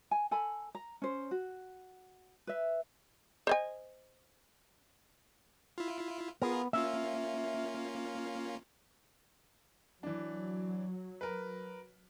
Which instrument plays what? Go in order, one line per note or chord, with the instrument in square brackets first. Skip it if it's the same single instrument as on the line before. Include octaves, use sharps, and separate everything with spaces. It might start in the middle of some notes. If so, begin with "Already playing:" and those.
[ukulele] G#5
A4 G#5 B5
A#5
C#4 C5
F#4
B4 E5
[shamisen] C5 D#5 G#5
[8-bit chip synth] E4 F4
[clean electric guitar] B3 [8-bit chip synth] F4 G#4 A#4
[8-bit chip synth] A#3 C#4 F4 [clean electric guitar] E5
[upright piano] E3 D4 [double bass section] F#3
[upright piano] A#4 B4